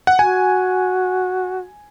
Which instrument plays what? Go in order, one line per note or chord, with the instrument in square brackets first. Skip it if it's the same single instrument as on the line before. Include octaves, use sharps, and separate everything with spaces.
[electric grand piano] F#5
[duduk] F#4 [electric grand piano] G#5